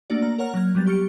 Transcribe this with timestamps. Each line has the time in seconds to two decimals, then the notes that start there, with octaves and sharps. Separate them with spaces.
0.10 A3 A#3 D4 F#4 D5
0.22 A#3 A#5
0.38 A#4 C#5 F#5 A#5 F6
0.54 F#3 A#3 F6 G#6
0.75 F#3 G3 B3 A6
0.86 G4 C#6 F6 C#7 D7